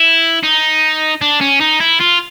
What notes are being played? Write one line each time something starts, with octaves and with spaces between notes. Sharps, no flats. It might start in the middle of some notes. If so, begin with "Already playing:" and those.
Already playing: E4
D#4
D4
C#4
D#4
E4
F4